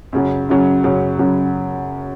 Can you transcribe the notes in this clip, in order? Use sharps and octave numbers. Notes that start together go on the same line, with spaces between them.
F#2 C#3 F#3
F#2 C#3 F#3
F#2 C#3 F#3
F#2 C#3 F#3